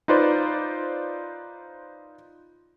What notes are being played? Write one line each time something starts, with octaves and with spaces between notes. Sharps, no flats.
D#4 F4 B4 C5 D5